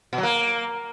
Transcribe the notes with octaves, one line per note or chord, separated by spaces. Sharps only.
B2
F#3
A#3